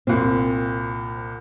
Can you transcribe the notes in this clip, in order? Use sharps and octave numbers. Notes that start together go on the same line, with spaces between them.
C2 A#2 C4